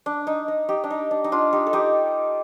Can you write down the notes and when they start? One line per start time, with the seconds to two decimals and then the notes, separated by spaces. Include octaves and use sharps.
0.06 D4
0.27 D#4
0.48 D#4
0.69 D#4 G4
0.84 D4
0.90 D#4
1.11 D4
1.24 D#4
1.32 D4 F4
1.53 D#4 G4
1.67 A4
1.73 D#4 G4